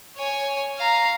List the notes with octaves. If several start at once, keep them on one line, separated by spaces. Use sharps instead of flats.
C#5 G#5
F5 A#5